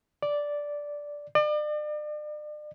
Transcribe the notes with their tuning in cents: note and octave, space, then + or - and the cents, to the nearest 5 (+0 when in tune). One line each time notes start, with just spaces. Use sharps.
D5 -5
D5 +40